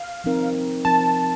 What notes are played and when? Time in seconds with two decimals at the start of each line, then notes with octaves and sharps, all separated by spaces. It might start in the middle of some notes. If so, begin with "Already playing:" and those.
Already playing: F5
0.24 F3 C4 D#4 A#4
0.85 F3 C4 D#4 A#4 A5